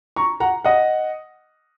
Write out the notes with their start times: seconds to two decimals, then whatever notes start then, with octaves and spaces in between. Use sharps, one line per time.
0.16 A#5 C#6
0.40 F#5 A#5
0.64 D#5 F#5